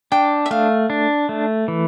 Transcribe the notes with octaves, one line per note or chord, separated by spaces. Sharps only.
D4 G5
E5
A3 F5
D4
A3
E3